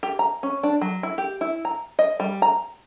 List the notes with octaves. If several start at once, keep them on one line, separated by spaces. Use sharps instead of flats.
G4
A#5
C#4
D4
F#3
E4
G4
E4
A#5
D#5
G3
A#5